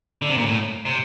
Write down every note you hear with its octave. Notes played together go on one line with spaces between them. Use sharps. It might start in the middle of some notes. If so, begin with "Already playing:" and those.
D3
C3
A#2
A2
C3